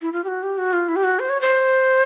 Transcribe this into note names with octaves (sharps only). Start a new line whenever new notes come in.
E4
F4
G4
F#4
G4
F#4
F4
E4
G4
F#4
C5
C#5
C5